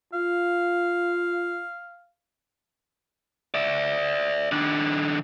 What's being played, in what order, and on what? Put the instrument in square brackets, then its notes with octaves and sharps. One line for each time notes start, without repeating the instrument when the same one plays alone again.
[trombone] F4 [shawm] F5
[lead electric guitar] D5 E5
D#3 D4